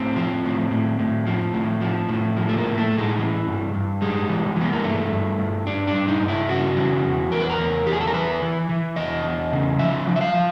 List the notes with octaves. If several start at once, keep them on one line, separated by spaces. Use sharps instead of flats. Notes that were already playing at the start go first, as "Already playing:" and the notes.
Already playing: A2 C4
F3
A2
A2
A2
F3
A2
F3
A2
F3
A3
A#3
A2
A3
A2
G#3
E3
G2
G2
G3 G#3
E3
E3
B3
A#3
G2 A3
G2
G2
G2 D4
D4
G2
D#4
G2
E4
C#3 F#4
E3
E2
E2 A#4
B4
A#4
E2
E2 G4
G#4
A4
A#4
E3 B4
E3
E3
E2 D#5
E2
C#3
F3 E5
F3
E5
F5
F3